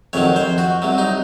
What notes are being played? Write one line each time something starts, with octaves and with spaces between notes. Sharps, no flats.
F2 C3 D#3 F#3 C#5
C5
F#4
C2 C3 F#3
D#4